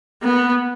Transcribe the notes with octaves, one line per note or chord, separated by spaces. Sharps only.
B3